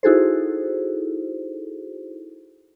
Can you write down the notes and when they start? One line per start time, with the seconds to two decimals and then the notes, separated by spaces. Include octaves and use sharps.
0.03 D#4 E4 F#4 G#4 A4 C5